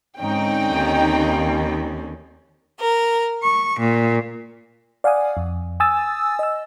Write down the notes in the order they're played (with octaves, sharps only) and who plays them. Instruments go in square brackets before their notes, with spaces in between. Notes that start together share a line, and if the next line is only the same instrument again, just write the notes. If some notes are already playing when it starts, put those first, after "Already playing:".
[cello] G#2 [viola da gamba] D3 C4 C#4 [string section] D#4 G5
[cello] D#2
[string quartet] A#4
C#6
A#2
[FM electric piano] D5 F5 F#5 G#5 D#6
F2
G#5 D#6 E6 A6
D#5 E6